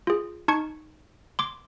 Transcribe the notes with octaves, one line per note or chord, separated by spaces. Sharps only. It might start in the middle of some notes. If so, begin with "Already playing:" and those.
F4 G#4
D#4 A5 C#6 G#6 C#7
C6 D6